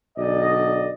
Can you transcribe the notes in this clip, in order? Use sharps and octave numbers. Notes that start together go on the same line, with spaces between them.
B1 D3 D5 D#5